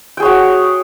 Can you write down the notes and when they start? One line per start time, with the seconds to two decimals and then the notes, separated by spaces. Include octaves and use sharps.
0.17 G5
0.20 G#4
0.23 C#5
0.25 F#4